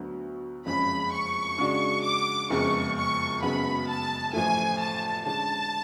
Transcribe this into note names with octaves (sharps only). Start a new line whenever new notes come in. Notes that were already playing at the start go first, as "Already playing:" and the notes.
Already playing: D2 D3 F#3 B3 F#4
F#1 F2 C#3 G#3 C#4 B5
C#6
C#3 G#3 D4 F#4
D6
F#1 F2 C#3 G#3 B3 C#6
C#6
F#1 F#2 C#3 G#3 B3 B5
A5
A1 A2 F3 A3 G#5
A5
D3 G#3 C#4 A5